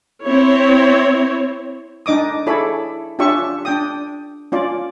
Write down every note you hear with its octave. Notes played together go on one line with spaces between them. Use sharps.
C4 E4 C#5
D4 D#4 D#5 D6 D#6
E4 G#4 A4 C#5 D5 B5
C#4 D4 F4 G4 E5 C#6
D4 G5 D#6
C#4 F4 D5